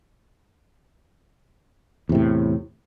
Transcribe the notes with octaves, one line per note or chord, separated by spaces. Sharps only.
E2 A2 C3